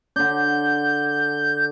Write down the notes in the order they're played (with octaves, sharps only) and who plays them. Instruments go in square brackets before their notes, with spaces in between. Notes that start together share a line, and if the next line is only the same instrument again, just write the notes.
[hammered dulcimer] D3 D4 [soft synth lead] G6